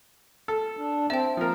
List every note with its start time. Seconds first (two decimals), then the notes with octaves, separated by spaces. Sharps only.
0.48 A4
0.77 D4
1.10 C4 E5 G5 A5
1.37 F3 A#3 A#4